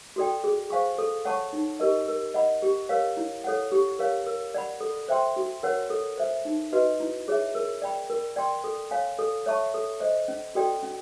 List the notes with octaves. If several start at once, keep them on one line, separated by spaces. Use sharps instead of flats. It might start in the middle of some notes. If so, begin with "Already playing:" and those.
F#4 A4 D5 G5
G#4
C5 F5 G#5 C#6
A4
C#5 F#5 A5 C#6
D#4
G4 A#4 D#5
A#4
D#5 F#5 B5
G4
A#4 C#5 F5
E4
A4 C#5 F#5
G4
A#4 C#5 F5
A#4
D5 F#5 B5
A4
C5 E5 G5 C6
F#4
A#4 C#5 F#5
A4
C5 E5
D#4
F#4 B4 D#5
E4
G#4 C#5 E5
A#4
D5 G5 B5
A#4
D5 G5 C6
A4
C#5 F5 G#5
A4
C#5 E5 A5 C#6
A4
C5 D#5
C#4
F#4 A4 D5 G5
C#4